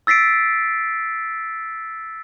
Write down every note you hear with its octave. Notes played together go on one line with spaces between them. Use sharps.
E6 A6 B6 C7 D7